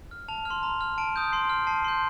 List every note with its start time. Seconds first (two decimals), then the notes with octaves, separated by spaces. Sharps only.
0.11 F6
0.28 A5 F7
0.45 F6
0.50 C6
0.63 A#5 F7
0.81 F6
0.98 A5 D7
1.16 D#6 G6
1.32 C6 C7
1.50 F6
1.67 A5 C7
1.84 C6 G6